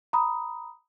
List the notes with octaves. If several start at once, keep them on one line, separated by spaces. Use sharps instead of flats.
A#5 B5 D#6